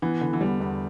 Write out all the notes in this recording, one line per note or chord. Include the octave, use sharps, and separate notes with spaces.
E3 B3
D3
E3
E2 G3
E2